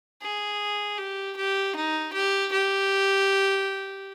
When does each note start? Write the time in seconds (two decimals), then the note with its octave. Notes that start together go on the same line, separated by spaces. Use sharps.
0.22 G#4
0.98 G4
1.36 G4
1.76 D#4
2.13 G4
2.52 G4